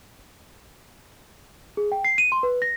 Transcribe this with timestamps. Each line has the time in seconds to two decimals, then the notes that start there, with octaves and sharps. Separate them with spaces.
1.77 G#4
1.92 G5
2.05 C7
2.18 D#7
2.32 C6
2.43 B4
2.62 A#6